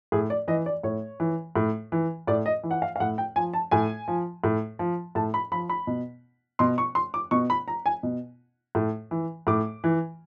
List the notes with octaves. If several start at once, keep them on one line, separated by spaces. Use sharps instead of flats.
A2 G#4
D5
E3 D#5
D5
A2 C#5
E3
A2
E3
A2 D5
D#5
E3
F#5
F5
F5
A2 F#5
G5
F3 G#5
A5
A2 G#5
F3
A2
F3
A2 A5
B5
F3 B5
B5
B2
B2 C6
C#6
C6
D6
B2 C#6
B5
A#5
G#5
B2
A2
E3
A2 D6
E3